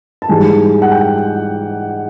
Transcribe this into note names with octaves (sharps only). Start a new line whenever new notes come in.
A5
G#2 E3 G3 G#5
F#5
G5